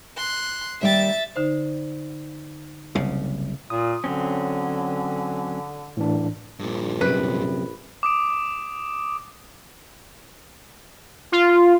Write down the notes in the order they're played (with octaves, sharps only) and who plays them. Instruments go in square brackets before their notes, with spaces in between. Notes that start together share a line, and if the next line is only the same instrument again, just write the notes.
[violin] C6 F#6
[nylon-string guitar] D#2 G3 G5 [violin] E5 A6
[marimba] D3 D#4 C5
[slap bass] F#1 C2 C#3
[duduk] A#2 [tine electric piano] D#6
[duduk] D3 [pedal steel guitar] F#3 C4 C#4
[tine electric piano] A2 E3 D4
[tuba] A#1 [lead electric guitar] G2 A#2
[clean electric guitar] F#2 C3 [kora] B4
[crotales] D6 D#6 D7
[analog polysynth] F4